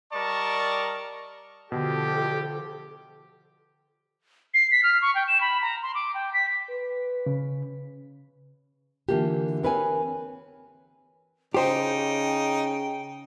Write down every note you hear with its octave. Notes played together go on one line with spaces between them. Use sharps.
G3 A#4 D5 D#5 A5 C#6
B2 D3 F3 G4 A4 E7
C7
B6
F6
C#6
G5
E7
B5
A#5
C6
D6
G5
B6
B4
C#3
D3 E3 A#3 F4 G4
C4 A#4 B4 C#5 G5 G#5
C#3 D#4 G4 C5 G5